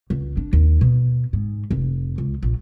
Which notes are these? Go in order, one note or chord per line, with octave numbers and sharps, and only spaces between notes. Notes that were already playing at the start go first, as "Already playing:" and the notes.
C#2
D4
D#2
B2
G#2
F1
C#2
A#1